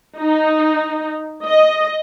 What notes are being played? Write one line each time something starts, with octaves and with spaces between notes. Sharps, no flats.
D#4
D#5